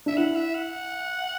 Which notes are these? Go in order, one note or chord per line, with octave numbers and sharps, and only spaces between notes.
D4 E5
E4 F#5
E5
F#5